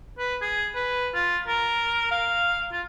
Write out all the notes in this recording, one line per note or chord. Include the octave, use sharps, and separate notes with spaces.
B4
G#4
B4
F4
A#4
F5
F4